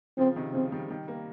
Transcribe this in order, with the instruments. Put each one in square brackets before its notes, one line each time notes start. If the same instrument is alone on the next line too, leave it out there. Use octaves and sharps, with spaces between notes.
[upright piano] C#3 F3 [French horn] C4
[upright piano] C3 D#3
[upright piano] C#3 F3 [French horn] C4
[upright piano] D#3 G3
D#3 G3
G3 A#3